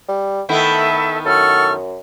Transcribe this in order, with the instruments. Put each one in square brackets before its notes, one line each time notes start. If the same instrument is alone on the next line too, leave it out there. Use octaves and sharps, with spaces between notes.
[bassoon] G3
[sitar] D#3 B3 E4 [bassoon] A3 [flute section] A4 E5
[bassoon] F#2 [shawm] A4 [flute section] F#5 C#6 F6